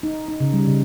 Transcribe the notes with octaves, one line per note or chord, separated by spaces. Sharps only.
D#4
D#4
C#3
G3
C#3